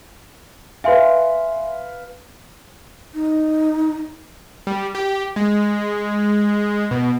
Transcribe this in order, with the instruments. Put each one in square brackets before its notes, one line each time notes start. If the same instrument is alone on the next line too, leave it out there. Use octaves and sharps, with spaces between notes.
[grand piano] B4 F5 [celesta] E5 G#5 C6
[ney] D#4
[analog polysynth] G3
G4
G#3
B2